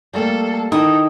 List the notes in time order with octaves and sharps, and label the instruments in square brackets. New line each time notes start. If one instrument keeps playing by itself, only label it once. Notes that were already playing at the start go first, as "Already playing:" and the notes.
[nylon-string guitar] G3 A3 A#3 [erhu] A4
[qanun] D#3 G5 [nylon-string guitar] E4 [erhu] A4 [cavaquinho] D#6